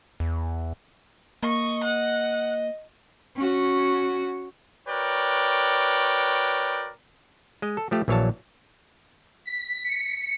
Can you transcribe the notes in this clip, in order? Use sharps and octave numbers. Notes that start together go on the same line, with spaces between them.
E2
A#3 D#5 C#6
F#5
C#4 F#4
F#4 A#4 B4 C#5 D5 G5
G#3 D#5
A4
F3 A3 G4
A#1 E3 F#3 C#5 F5 A5
B6
C#7